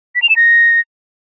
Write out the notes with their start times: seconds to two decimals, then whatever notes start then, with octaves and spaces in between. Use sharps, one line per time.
0.15 B6
0.22 F7
0.29 E7
0.36 A#6